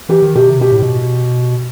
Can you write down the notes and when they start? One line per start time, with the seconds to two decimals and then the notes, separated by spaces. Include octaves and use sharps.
0.09 E3 G4
0.22 D#3
0.35 B2 G4
0.49 C3
0.60 B2 G4
0.71 A2
0.82 B2